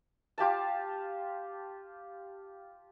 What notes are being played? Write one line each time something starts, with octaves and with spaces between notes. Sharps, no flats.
F4 G4 F5 A5